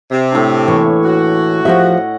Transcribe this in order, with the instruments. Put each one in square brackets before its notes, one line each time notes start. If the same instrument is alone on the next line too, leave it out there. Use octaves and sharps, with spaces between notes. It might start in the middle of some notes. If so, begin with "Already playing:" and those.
[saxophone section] C3
[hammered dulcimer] A2 D4
[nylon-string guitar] E3 A#3 [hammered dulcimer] C#5
[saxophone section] F#4
[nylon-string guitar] F3 G4 E5 [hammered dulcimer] D#5 F#5